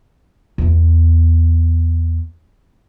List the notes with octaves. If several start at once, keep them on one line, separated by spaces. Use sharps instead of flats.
E2 B3